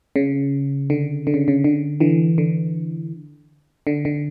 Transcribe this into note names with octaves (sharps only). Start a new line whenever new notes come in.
C#3
D3
D3
C#3
C#3
D3
D3 E3
D3
D3
D3